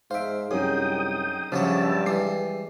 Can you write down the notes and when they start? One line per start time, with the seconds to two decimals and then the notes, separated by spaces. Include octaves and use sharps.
0.11 G#2 C5 E5 F5 D7
0.51 C2 F#2 D#4 G#4 G5 D#6
1.52 G2 C#3 F3 F#3 C#5 D5 E5 A5
2.06 E3 G3 G#3 C7